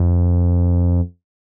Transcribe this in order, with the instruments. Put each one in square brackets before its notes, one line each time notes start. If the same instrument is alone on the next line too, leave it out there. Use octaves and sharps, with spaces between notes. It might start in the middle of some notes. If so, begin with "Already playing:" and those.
Already playing: [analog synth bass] F2